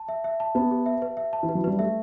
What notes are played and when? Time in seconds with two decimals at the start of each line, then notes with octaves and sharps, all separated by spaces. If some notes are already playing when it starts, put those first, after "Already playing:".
Already playing: A5
0.08 E5
0.24 E5
0.40 A5
0.55 B3 A5
0.71 G4
0.86 E5
1.02 B4
1.17 E5
1.33 A5
1.43 E3
1.49 B4
1.55 F#3
1.64 G3 B4
1.79 A3 E5